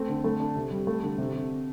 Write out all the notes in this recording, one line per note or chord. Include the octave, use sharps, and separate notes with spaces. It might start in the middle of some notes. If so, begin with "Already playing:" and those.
Already playing: A3 C4
D3
A3
D4
C3
G3
A3
D3
C3
C3